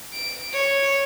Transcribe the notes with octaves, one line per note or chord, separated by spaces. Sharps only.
D7
C#5